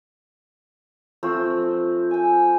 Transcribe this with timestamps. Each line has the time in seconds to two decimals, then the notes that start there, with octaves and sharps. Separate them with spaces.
1.23 F3 A3 C4 F4
2.11 G5 G#5